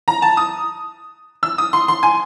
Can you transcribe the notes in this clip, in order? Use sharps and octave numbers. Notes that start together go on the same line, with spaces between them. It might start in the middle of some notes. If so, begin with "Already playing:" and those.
A#5
A5
D#6
E6
D#6
C6
C6
G#5